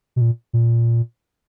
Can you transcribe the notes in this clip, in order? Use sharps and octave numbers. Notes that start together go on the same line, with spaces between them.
B2
A#2
A#2